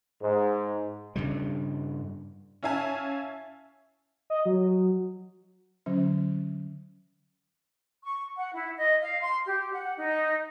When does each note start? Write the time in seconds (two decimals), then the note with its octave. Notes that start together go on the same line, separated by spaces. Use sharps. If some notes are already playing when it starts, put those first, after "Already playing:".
0.22 G#2
1.16 G2 C#3 G3
2.63 C#4 E4 E5 F5 G#5 A5
4.30 D#5
4.45 F#3
5.86 D3 F#3 C#4
8.03 C#6
8.37 F#5
8.53 E4
8.77 D#5
9.02 F5
9.22 C6
9.45 G4
9.72 F#5
9.97 D#4